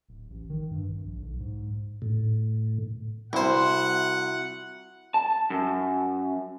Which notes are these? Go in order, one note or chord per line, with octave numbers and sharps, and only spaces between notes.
D1
A1
D#3
G2
G#1
A#1
B1
G#2
A2
C2 E4 F#4 C5 F#5
A5
F#2